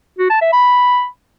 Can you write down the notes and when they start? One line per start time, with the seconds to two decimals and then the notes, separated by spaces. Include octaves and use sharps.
0.18 F#4
0.30 A5
0.41 E5
0.53 B5